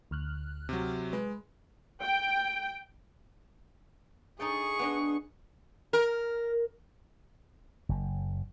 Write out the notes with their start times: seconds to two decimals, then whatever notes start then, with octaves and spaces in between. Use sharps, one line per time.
0.11 D2 F6 F#6
0.69 C3 F#3
1.13 G#3 B4
2.02 G5
4.40 D#4 G#4 A4 G5 C#6
4.79 B3 D4 D#5
5.93 A#4
7.89 F#1